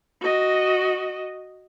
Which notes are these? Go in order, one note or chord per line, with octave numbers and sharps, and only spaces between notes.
F#4 D#5